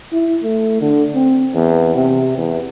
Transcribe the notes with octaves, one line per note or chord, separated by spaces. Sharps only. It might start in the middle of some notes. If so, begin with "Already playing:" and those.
E4
A3
D3
C4
E2
C3
E2